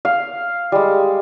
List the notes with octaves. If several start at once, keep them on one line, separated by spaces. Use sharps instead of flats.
F5
G3 G#3